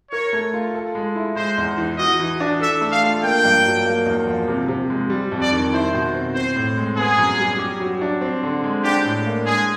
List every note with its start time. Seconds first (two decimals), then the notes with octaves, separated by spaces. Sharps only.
0.11 A#4 C#5
0.33 A3
0.54 F4
0.75 A4
0.95 G#3
1.15 E4
1.36 G#3 C5
1.58 E2
1.78 E3
1.99 F#4 D#5
2.20 E3
2.40 D4
2.61 A4 E5
2.81 A3
2.92 F5
3.03 F4
3.23 A#3 G5
3.45 G2
3.66 F#3
3.85 A#3
4.06 E2
4.27 F3
4.48 C3
4.68 C3
4.90 G#3
5.10 G3
5.32 F2
5.41 D5
5.52 D#3
5.73 E4 C5
5.94 B2
6.15 C4
6.35 C4 C5
6.56 A2
6.77 G#3
6.97 B3 G#4
7.18 F#2
7.39 G3
7.59 G4
7.80 F#3
8.01 D4
8.21 C4
8.43 D3
8.64 G#3
8.84 D4 G4
9.04 A2
9.26 A#3
9.46 G#3 G#4